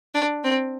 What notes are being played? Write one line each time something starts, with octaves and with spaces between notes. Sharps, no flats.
D4
C4